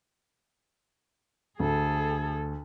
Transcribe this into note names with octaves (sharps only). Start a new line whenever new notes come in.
D2 G#4 A4